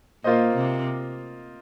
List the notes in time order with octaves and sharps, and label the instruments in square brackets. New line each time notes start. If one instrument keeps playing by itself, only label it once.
[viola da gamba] A#2 [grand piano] A#3 F4 C5 D#5
[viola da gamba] C3